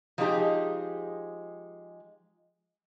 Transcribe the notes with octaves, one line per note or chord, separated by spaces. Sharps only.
F3 F#3 G#3 D#4 G4 G#4